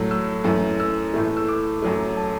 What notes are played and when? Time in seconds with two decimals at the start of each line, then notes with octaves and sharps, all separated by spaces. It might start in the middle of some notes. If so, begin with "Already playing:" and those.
Already playing: A2 F#3 A3
0.11 E6
0.44 F#2 E3 A3
0.80 E6
1.14 A2 E3 A3
1.37 E6
1.48 D6
1.82 F#2 F#3 A3
2.17 A5